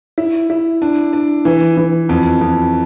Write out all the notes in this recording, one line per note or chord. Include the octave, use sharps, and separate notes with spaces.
E4
E4
D4
D4
E3
E3
F2
F2